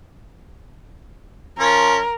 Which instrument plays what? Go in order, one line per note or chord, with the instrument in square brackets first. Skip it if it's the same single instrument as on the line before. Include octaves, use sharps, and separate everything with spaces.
[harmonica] F3 C#4 [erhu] A#4